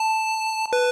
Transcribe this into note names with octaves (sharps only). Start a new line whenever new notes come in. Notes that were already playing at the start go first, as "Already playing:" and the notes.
Already playing: A5
B4